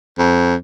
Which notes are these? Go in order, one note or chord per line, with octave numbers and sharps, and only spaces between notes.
F2